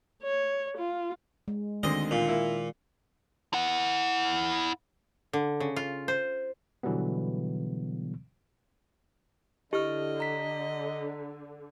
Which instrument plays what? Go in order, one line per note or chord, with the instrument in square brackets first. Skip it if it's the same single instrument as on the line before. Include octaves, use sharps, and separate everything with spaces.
[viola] C#5
F4
[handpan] G#3
[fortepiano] D2 D3 C4 [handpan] D#3 [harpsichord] D#5
[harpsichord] A#2
[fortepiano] A#3 E4
[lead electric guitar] E4 F#5
[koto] D3
C#3
F4
C5
[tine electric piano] B2 D3 E3 F#3 G3 B3
[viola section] D3 [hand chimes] E4 F6 [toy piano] G4 [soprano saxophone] D#5
[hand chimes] A#5 B6